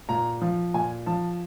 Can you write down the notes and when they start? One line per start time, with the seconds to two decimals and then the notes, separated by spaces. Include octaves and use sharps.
0.09 A#2 A#5
0.42 F3
0.74 A#2 G#5
1.06 F3 A5